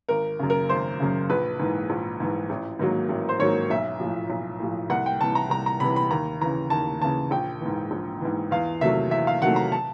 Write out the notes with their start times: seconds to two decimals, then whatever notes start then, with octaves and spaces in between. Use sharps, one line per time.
0.09 G#1 A#4
0.39 F#2 C#3
0.50 A#4
0.69 G#1 C5
1.00 F#2 C#3
1.30 A#1 B4
1.60 G#2 E3
1.90 A#1
2.20 G#2 E3
2.50 A1
2.79 G#2 D#3 F#3 A#3
3.09 A1
3.29 C5
3.39 G#2 D#3 F#3 A#3 C#5
3.70 B1 E5
4.00 A2 F3
4.30 B1
4.60 A2 F3
4.90 C2 F#5
5.06 G5
5.21 C3 E3 A5
5.35 A#5
5.50 C2 A#5
5.66 A#5
5.80 C3 E3 B5
5.96 B5
6.11 D#2 A#5
6.41 C#3 E3 A#5
6.70 D#2 A5
7.01 C#3 E3 A5
7.31 A#1 G5
7.61 G#2 E3
7.91 A#1
8.21 G#2 E3
8.51 E2 F5
8.81 C3 D#3 F#3 A3 E5
9.11 E2 E5
9.27 F5
9.41 C3 D#3 F#3 A3 F#5
9.56 A#5
9.72 A5